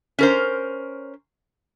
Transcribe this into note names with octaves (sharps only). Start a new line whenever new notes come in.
C#4 A#4 C5